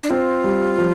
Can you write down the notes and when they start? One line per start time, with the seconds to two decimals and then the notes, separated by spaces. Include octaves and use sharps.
0.03 D4
0.10 C4 F4
0.44 G3
0.78 F3